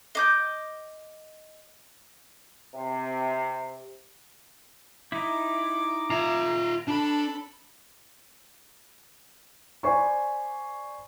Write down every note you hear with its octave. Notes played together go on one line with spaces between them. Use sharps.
D#5 D6 G6
C3
D#4 E4 D6
F4 E5 A#5
D4 A4 B5
C5 D5 G#5 B5 C#6